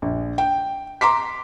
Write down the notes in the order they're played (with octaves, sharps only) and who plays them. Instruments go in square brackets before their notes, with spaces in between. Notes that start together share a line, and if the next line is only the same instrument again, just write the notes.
[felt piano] A#1
G5
A#5 C6 D6 B6